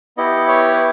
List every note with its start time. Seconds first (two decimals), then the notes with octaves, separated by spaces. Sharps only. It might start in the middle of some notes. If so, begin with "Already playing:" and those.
0.17 B3 E4 G4 D#5
0.48 C#5
0.73 B4